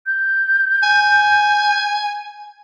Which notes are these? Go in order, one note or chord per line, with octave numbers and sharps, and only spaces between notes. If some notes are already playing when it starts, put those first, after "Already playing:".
G6
G#5